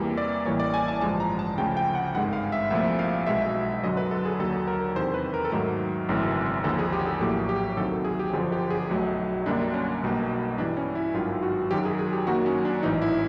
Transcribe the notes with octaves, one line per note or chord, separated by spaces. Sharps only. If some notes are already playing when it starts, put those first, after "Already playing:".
Already playing: E2 C3 E3 G3 A#3
D5
A1 A2 E3 G3 A#3 C#5
D5
G#5
A5
A1 G2 D3 F3 G#3 A5
A#5
A5
D2 C#3 F3 A3 G5
G5
F#5
G#1 G2 D#3 G#3 F#5
F5
E5
C2 A#2 F3 A3 E5
F5
B1 B2 G#3 E5
F#2 D3 F#3 D#5
B4
A4
G#4
D#2 D3 F#3 A4
A#4
E2 C3 D#3 C5
B4
A#4
A4
G#2 D#3 F#3 A3 A#4
G#1 F#2 C#3 E3 A3
D#2 D3 F3 A4
G#4
G4
A4
A#1 A2 F#3 A#3 G4
G4
D2 C3 D#3 F#3 A4
G#4
G4
G1 F#2 D3 F3 G#4
G4
G#4
B1 B2 F#3 A3
F#2 D3 G3 A#3 D4
C#4
B1 B2 G3 A#3
G2 E3 G3 D4
C#4
E4
G#1 G2 D#3 F#3 F4
F#4
F#2 D#3 F#3 G4
G#4
G#4
G4
F#2 D#3 F#3 A#3 F#4
C#4
D4
A1 G#2 E3 D#4
E4